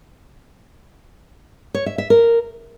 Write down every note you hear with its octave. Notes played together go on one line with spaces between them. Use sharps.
C#5
E5
E5
A#4